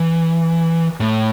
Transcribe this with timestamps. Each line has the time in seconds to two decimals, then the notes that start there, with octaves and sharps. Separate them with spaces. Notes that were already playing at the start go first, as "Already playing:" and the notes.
Already playing: E3
1.00 A2